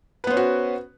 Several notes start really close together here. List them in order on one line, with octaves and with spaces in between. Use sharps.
B4 B3 C5 C#4 F#4